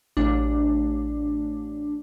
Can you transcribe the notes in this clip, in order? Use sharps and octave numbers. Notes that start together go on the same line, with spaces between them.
A1 D4